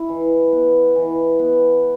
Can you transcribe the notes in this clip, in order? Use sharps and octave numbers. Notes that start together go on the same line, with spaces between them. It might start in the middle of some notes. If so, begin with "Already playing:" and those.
Already playing: E4
E3
B3
E3
B3